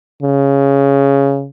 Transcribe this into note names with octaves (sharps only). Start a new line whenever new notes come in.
C#3